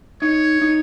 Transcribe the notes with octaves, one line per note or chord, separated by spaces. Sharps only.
D#4 C#5
D#4